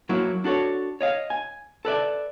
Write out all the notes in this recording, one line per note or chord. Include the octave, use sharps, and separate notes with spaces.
F#3 A#3 E4 F#4
D4 F#4 A4 C#5
C#5 D#5 F5
G#5
A4 B4 D5 E5